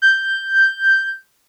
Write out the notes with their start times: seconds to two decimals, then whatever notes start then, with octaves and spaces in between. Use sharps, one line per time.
0.02 G6